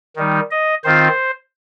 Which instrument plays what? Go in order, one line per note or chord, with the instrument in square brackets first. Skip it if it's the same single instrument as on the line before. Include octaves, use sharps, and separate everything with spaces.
[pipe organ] D#3 G3 D#4
D#5
D#3 C4 F4 C5